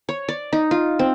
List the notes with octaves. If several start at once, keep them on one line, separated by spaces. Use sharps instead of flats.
C#5
D5
D#4
F4
C4